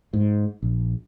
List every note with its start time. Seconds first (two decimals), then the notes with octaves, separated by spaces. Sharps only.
0.13 G#2
0.62 A#1